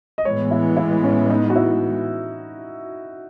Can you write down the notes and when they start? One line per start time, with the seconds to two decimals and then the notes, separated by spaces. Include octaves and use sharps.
0.18 D#5
0.24 A2 E3 G#3 B3 C#5
0.51 E4
0.77 E4
1.04 C#4
1.30 D#4
1.50 F#4
1.56 E4